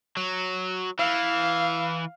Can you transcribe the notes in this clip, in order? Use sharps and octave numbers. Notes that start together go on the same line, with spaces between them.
F#3
E3 F5